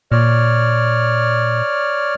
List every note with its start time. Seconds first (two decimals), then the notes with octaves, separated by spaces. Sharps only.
0.12 A#2 C#5 D5 F6